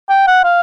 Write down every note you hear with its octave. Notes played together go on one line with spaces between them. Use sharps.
G5
F#5
F5